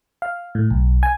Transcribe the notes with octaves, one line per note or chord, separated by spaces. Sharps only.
F5
A2
B1
G#5